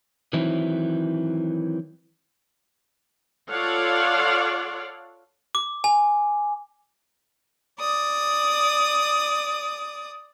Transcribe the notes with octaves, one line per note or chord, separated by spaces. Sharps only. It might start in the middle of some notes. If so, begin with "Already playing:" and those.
D#3 E3 F#3 C4 E4
F4 A4 C#5 D5 F5 F#5
D6
G#5
D5 D#6